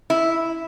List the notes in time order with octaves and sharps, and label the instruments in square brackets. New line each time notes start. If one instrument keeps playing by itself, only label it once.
[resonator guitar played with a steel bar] E4